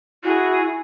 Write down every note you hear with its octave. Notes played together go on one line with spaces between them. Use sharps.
E4 F#4 G#4